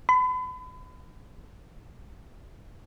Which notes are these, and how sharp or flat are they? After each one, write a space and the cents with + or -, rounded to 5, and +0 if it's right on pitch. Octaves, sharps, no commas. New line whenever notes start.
B5 +35